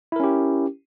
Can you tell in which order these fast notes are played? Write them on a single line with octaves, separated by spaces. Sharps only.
E4 A#4 C#4 G4